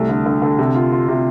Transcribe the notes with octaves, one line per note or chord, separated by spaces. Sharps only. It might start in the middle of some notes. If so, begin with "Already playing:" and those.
Already playing: C2 A3
D3
D3
D3
C3
F4
F4
C3